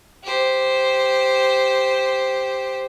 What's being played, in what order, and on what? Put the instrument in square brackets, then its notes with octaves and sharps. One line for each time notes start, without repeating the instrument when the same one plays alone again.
[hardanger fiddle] G4 C5